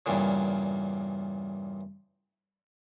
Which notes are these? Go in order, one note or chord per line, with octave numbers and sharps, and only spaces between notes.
E2 G2 A#2 C#3